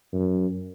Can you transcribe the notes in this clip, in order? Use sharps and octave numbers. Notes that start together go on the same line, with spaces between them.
F#2